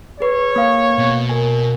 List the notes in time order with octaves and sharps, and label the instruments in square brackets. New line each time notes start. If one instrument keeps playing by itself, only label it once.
[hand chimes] G#4 B4 [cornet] C#5
[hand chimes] A#3 F5 C#6
[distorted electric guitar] B2
[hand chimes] A#4 G#5